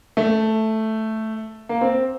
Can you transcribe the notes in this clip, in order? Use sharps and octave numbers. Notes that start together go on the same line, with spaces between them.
A3
A#3
C4